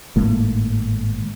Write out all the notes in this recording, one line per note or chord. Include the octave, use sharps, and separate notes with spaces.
G#1 A2 G#3 A#3